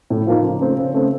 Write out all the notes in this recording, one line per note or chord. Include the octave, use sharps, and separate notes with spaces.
A2
F3 A#3 D#4
C#3
A3 C4
C#3
A3 C4